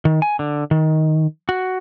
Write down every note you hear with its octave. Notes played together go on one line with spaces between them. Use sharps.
D#3
G#5
D3
D#3
F#4